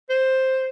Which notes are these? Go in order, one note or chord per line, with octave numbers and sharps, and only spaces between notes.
C5